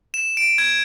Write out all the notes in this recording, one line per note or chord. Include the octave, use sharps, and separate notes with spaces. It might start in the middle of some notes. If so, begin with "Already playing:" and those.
E7
D7
G#6